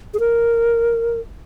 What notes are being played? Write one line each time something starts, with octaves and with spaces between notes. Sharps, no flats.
G#4
A#4